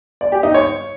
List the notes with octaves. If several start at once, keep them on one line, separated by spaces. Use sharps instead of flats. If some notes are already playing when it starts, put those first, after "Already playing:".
D5
G4
D#4
C#5